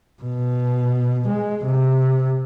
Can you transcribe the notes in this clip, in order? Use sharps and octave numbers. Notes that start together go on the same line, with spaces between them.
B2
G#3
C3